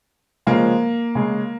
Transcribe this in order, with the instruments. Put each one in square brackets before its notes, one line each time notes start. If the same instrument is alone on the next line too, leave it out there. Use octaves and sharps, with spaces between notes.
[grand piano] C#3 F3 G#3 A#3
C#3 G#3